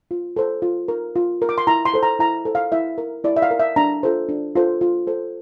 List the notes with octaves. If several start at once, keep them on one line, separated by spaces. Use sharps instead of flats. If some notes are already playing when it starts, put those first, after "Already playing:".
F4
A4 C5
F4
A#4
F4
A#4
D6
C6
E4 A#5
C6
A4 C5
A#5
E4 A#5
A4 C5
F5
E4 E5
A#4
E4 D5
E5
F5
A#4
E5
D4 A#5
F4 A4 C5
D4
F4 A4 C5
F4
A4 C5